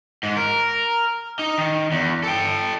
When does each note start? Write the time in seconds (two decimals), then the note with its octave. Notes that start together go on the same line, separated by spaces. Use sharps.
0.23 G#2
0.37 A#4
1.39 D#4
1.58 D#3
1.92 E2
2.23 A4 G5